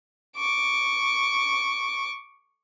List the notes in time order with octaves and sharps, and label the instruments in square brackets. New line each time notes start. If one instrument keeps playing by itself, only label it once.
[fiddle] C#6 D6